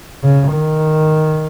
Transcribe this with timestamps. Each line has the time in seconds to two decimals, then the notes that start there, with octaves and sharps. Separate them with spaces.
0.23 C#3
0.53 D#3